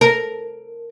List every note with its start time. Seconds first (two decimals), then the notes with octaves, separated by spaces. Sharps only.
0.01 A#4